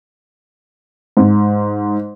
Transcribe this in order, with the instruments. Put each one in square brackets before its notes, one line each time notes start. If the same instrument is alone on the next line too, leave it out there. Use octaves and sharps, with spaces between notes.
[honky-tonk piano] G#2